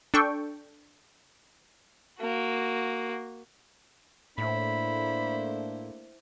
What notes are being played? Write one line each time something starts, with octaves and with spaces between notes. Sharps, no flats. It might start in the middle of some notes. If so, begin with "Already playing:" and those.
D4 A4 G5 C#6
A#3 F#4
A2 A3 A#3 D4 E4 C5 B5